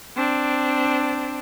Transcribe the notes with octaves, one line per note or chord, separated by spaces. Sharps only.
C4 D4